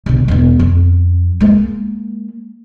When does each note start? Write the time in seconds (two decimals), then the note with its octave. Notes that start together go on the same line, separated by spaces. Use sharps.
0.06 B1 D3
0.28 E1 B3
0.59 F2
1.40 G#3 A#3